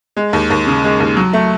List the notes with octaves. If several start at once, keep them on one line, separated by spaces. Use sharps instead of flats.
G#3
D#2
D#2
C#3
G#3
D#2
F#3
A3